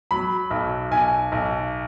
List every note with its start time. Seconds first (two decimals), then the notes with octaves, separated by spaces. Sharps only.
0.11 F#3 B5
0.51 B1
0.91 B1 G#5
1.32 B1